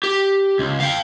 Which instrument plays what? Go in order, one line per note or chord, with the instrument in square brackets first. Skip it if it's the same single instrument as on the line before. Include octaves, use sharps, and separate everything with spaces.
[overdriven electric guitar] G4
C#2
F5 G5